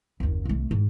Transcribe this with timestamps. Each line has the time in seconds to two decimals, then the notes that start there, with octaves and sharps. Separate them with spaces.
0.20 F#1 D#2
0.45 C2 A3
0.71 G#2